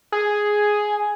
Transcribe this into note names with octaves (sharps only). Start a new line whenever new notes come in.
G#4